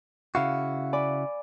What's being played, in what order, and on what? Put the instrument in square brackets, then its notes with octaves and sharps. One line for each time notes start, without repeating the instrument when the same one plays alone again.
[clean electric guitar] C#3 E4 F#4 [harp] F5
[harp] D5 G#5 B5